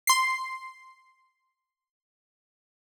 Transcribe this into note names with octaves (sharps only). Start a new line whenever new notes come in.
C6 C7